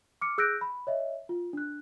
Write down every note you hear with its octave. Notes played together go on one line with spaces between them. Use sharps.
D6 F6 C#7
G#4 E6 F#6 G6 A#6 D7
B5
C#5 D#5 E5
F4
D4 F#6